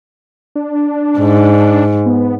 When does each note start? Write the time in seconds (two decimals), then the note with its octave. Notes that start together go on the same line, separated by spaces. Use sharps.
0.56 D4
1.19 G#2
2.06 B3